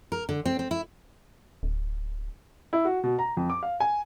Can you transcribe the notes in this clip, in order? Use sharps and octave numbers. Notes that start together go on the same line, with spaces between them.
A#4
D3
C4
C4
E4
D1
E4
F#4
B2
A#5
F2
D6
F5
G#5